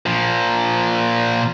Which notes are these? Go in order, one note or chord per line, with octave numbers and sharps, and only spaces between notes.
A#2 F3